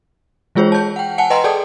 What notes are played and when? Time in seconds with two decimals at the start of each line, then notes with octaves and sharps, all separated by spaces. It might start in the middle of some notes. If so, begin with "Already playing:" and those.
0.55 E3 G#3 F4 G#4 C5 C#5
0.72 A5 G6
0.96 F#5 G5
1.18 F#5 G#5 A5 C#7
1.30 B4 D#5 F#5 G5 A#5 C6
1.44 G#4 A4 D5 G5 A5 D#6